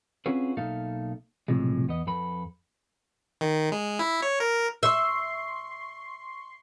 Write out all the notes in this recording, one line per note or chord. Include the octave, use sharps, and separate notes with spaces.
C4 C#4 F4 F#4 G#4 B4
B1 A#3 D#4 A4 E5 F5
B1 A2 C3 F3 G#3
E2 B3 D#5
F2 A4 B4 B5
D#3
G#3
E4
C#5
A#4
E5 C6 C#6 C7